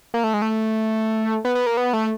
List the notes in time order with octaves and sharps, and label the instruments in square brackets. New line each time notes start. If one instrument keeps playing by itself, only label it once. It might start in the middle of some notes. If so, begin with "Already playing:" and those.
[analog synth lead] A#3
A3
G#3
A3
B3
B3
A#3
B3
A3